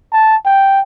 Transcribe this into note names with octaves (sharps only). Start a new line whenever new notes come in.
A5
G5